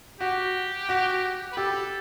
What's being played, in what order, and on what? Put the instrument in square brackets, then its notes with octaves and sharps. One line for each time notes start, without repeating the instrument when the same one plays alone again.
[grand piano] F#4 [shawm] G4
[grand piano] F#4
[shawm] B4
[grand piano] G4 [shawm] A4